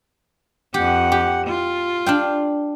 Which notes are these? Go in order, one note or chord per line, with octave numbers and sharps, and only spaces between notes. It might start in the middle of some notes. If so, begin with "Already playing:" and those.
F2 G4 F#5
G4
F4
D4 F5 G5